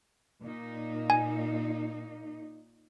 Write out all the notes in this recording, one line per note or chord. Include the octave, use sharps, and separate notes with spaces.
A#2 D#4
G#5